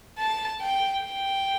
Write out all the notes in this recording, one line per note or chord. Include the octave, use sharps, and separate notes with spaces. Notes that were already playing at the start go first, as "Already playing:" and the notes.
A5
G5
G5